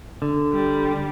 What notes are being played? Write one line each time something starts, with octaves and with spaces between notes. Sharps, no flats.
D3
G3